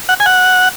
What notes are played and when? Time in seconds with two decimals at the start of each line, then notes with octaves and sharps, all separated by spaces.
0.09 F#5
0.20 G#5
0.26 F#5